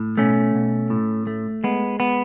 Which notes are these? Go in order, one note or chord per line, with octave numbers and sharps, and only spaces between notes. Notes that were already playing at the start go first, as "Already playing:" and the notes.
Already playing: A2
B2 A3 C#4
B2
A2
A3
G#3 B3
B3